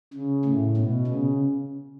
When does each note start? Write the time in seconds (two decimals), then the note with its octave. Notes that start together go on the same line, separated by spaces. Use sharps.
0.14 C#3
0.45 A2
0.77 B2
1.07 C#3